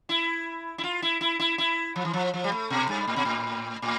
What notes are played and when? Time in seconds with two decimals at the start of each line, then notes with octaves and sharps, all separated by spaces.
0.09 E4
0.78 E4
0.84 F4
1.02 E4
1.21 E4
1.39 E4
1.58 E4
1.96 F3
2.05 E3
2.13 F3
2.34 F3
2.44 G3
2.52 A3
2.70 B2
2.89 G2
3.07 A2
3.16 B2
3.25 A2
3.82 A2